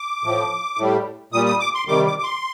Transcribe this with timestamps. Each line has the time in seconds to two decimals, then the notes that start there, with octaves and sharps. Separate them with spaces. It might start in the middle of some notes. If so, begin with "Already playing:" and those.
Already playing: D6
0.24 A2 F3
0.77 A2 G3
1.32 A#2 G3 D#6
1.46 D#6
1.60 D6
1.74 C6
1.87 C3 D#3 G3 D6
2.06 D6
2.19 D6
2.24 C6